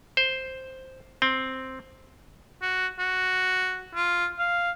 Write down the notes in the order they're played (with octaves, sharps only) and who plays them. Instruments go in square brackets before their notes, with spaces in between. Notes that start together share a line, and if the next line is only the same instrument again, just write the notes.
[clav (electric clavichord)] C5
C4
[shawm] F#4
F#4
F4
F5